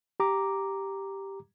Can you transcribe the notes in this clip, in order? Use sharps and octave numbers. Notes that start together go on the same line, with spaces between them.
G4 A#5 D6